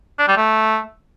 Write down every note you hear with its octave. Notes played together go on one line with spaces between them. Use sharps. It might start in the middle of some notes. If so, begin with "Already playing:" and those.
D4
G3
A3